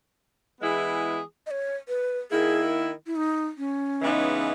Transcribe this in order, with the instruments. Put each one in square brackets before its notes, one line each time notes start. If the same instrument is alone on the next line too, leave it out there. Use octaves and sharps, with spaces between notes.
[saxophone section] E3 G#3 B3 E4 G#4
[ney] D#5
C#5
B4
[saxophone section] D#3 A#3 E4 [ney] G#4
[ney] E4
D#4
C#4
[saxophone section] C#3 E3 G#3 B3 D#4